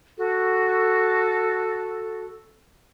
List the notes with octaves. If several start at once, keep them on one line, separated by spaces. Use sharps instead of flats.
F#4 A4